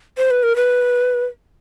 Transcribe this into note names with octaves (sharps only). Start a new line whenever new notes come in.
C5
B4
A#4
B4